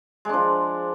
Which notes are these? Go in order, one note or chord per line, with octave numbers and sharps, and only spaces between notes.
F3 G#3 D4